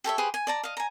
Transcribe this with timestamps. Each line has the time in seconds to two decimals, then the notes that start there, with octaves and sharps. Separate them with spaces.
0.04 G4 A4 C#5 E5
0.18 G4 G#4 B4 C5
0.34 G#5
0.47 D5 A5 A#5
0.63 D#5 F5
0.77 G#5 A#5